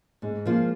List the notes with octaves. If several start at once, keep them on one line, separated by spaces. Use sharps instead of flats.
G#2 G#3
F3 A#3 F4